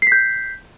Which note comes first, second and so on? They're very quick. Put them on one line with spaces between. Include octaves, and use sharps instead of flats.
C7 B6 G6